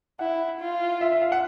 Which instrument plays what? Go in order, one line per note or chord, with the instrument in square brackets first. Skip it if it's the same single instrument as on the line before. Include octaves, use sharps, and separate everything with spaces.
[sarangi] E4 [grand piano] F#5
[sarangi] F4
[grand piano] E5
E5
F5
F#5